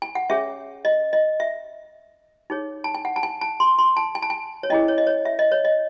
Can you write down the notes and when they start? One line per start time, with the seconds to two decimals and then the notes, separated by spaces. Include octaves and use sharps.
0.02 G#5
0.15 F#5
0.30 C#4 G#4 C#5 E5
0.85 D#5
1.13 D#5
1.40 E5
2.50 D#4 G#4 C#5
2.84 A5
2.94 G#5
3.05 F#5
3.16 A5
3.23 G#5
3.41 A5
3.60 C6
3.79 C6
3.97 A5
4.15 G#5
4.22 A5
4.30 G#5
4.63 C#5
4.70 C#4 E4 G#4 D#5
4.88 C#5
4.98 D#5
5.07 C#5
5.25 E5
5.39 D#5
5.52 C#5
5.65 D#5